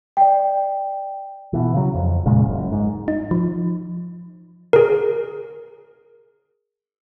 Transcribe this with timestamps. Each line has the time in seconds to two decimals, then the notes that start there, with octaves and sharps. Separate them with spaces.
0.17 D5 G5
1.53 B2 E3
1.74 C#3 F#3
1.95 F2
2.25 F1 A#2 C#3 G#3
2.48 F#1 F#2
2.72 G#2
3.08 D#4
3.31 F3
4.73 G#4 A#4